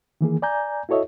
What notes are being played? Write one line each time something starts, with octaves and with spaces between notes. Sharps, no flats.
D#3 E3 A#3 G#4
D5 G#5 A#5 G6
E4 F#4 A4 C#5 D#5 E5